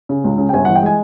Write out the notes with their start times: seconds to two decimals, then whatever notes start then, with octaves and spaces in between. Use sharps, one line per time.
0.09 C#3
0.24 C#2
0.38 C#3
0.49 G5
0.53 G1 G#5
0.65 E3 F#5
0.75 G5
0.83 G#3 G#5